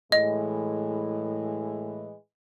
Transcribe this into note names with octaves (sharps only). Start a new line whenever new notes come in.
A2 E3 G#3 D#5